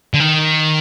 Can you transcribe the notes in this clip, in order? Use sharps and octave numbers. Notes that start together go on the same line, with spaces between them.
D3
D#3